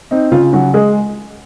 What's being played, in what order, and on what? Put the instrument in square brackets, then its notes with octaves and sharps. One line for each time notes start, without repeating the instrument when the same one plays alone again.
[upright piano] C4 D#4
C#3 F4
C#3 F#3 F#4
G#3 G#4